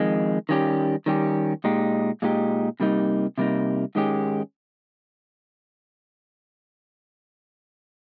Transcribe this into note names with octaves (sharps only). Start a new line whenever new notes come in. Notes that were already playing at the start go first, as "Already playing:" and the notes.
Already playing: F2 D#3 G#3
D#3 G3 C#4 G4
D#3 G3 C#4 G4
A#2 G#3 D#4 G4
A#2 G#3 D#4 G4
C3 G3 A#3 D#4
C3 G3 A#3 D#4
G#2 D#3 G#3 C#4 G4